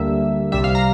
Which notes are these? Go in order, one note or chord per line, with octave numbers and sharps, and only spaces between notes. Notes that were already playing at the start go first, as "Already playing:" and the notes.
Already playing: D2 D3 G3 A#3 E5
C2 C3 G3 E5
F5
A#5